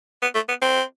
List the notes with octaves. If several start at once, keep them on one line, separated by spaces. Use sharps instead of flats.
B3
A3
B3
C4